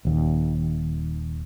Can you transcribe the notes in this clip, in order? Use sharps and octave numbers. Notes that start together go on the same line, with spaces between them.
D#1 D#2